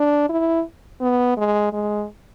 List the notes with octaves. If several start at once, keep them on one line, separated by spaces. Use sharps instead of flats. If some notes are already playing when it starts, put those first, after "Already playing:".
Already playing: D4
E4
B3
G#3
G#3